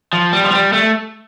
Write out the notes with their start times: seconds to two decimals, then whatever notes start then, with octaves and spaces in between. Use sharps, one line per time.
0.13 F3
0.33 G3
0.44 F3
0.53 G3
0.73 A3